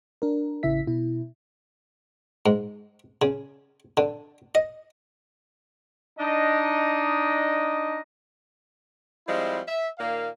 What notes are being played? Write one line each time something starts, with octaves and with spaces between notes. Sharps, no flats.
D4 A#4
A1 C#3 E4 E5 B6
B2 E4
G#2
C#3
D3
D#5
D4 D#4 D#5
F3 G3 G#3 C4 E4
E5
A#2 D#3 A#3 F5